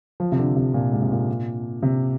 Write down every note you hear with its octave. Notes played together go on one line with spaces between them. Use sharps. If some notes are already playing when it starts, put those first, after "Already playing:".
F3
C3
D3
C3
A#2
G#2
C3
A#2
C3